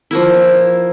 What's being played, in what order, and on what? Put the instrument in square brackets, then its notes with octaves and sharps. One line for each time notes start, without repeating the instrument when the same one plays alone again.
[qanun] F3 A#3 E4